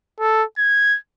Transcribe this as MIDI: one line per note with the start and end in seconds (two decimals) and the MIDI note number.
0.20 0.44 69
0.59 0.97 92